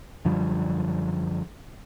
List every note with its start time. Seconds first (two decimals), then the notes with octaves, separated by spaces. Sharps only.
0.25 F#2 D3 F3 G3